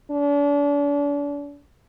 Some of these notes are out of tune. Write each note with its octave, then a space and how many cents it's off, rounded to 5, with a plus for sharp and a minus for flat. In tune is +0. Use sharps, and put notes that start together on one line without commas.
D4 -40